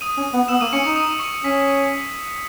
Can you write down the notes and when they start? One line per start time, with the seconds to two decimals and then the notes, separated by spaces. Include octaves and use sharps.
0.01 D#6 D#7
0.17 C#4
0.33 B3
0.48 B3 E6 E7
0.61 A#3 D#6 D#7
0.73 C#4 C#6 C#7
0.84 D#4 D#6 D#7
0.96 D#6 D#7
1.20 C#6 C#7
1.44 C#4 B6